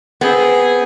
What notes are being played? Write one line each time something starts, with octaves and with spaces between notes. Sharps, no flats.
B3 C4 G#4